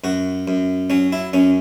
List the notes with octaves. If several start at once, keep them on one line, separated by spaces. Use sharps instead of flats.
F#2 F#4
F#2
F#3 C#4
E4
F#2 C#4